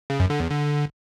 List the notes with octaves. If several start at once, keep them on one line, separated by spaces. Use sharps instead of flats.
C#3
F#2
D3
E2
D3